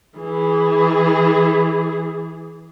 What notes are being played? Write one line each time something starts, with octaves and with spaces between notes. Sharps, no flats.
E3 G#4